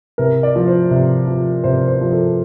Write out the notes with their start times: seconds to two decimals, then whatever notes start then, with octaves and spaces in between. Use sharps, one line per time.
0.18 C3 A#4
0.43 D5
0.56 F3
0.67 C5
0.91 C3
1.27 F3
1.64 C3 C5
1.88 C5
2.01 F3
2.12 A4